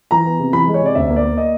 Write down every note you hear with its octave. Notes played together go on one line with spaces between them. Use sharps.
E3 A#5
B3
C3
E3 B5
G#3
C#5
C3 D5
D2 E5
A#3
D5
A#3
D#5